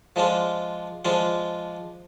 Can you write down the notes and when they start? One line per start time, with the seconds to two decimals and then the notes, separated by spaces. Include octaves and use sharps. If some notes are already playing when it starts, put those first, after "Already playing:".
0.16 F3 G#3 D4 F4
1.05 F3 G#3 D4 F4